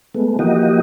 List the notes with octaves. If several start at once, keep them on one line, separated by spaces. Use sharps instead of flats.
G#3 A3 B3
E3 F3 A#3 F#4 G4 D#5